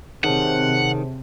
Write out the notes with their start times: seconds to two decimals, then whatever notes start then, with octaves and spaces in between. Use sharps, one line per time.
0.24 C3 D#3 G#4 C#5 F#5 A5